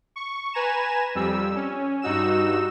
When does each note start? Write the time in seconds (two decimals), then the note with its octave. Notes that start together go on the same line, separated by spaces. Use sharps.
0.16 C#6
0.53 B4 G#5 A#5 E7
1.15 F2 G3 E6
1.56 C#4
2.02 G2 D#4 F#4 E6 E7